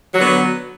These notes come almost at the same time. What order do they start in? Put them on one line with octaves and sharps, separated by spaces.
F#3 D3 B3